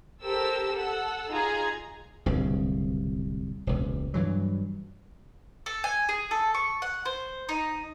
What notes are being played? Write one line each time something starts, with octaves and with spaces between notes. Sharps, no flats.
G4 A4 A#4 C5 E6
A4 F#5 E6
D#4 F4 G#4 A#5
D1 C2 C#3
E1 C#2 A#2
G2 E3 F#3
A4
G#5
G#4
A4
C#6
F#5
C5
D#4